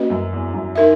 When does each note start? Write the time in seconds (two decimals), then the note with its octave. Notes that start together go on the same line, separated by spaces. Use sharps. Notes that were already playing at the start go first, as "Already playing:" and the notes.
Already playing: A#3 C#4 F#4 B4 D#5
0.10 F#2
0.33 E2
0.54 F#2
0.75 D#4 A#4 E5